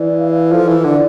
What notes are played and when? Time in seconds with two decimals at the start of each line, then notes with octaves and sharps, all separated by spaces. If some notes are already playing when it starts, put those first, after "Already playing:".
Already playing: E3 D5
0.19 F5
0.52 F3 A4
0.68 E3
0.84 D3 D5